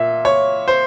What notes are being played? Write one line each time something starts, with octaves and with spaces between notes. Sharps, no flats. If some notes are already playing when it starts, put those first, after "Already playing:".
Already playing: A#2 E5
C#5
C5